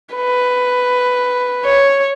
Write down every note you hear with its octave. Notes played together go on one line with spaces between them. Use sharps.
B4
C#5